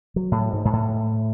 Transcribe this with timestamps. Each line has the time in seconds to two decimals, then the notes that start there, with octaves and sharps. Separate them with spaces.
0.16 F#3
0.32 A2
0.53 G#2
0.65 G#2
0.73 A2